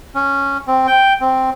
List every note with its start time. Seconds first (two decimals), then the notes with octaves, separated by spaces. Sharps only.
0.15 C#4
0.68 C4
0.87 G5
1.21 C4